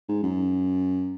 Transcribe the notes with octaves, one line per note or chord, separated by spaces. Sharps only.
G#2
F#2